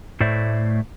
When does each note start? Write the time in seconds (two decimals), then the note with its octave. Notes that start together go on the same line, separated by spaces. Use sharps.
0.21 A2 A3 C5 D5 E5